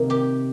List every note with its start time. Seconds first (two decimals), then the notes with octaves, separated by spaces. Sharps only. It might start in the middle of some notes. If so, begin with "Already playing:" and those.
Already playing: C3 D#3 A#3 A#4
0.10 G4